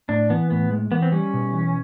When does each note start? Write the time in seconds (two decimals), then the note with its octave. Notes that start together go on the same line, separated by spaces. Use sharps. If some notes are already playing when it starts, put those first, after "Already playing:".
0.09 A2 D4
0.30 E3 B3
0.50 A2 B3
0.71 G#3
0.92 E3 B3
1.02 C4
1.12 G3 C#4
1.34 B2
1.53 E3